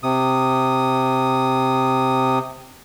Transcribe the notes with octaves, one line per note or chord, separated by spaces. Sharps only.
C3 D#6